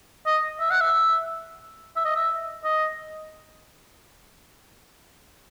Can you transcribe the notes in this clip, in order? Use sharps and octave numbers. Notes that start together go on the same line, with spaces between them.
D#5
E5
F#5
E5
E5
D#5
E5
D#5